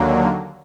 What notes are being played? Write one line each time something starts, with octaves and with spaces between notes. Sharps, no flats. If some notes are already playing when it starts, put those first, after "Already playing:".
Already playing: D#2 D3 F#3 A#3